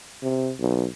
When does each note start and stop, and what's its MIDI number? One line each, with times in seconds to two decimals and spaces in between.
0.23 0.52 48
0.60 0.87 35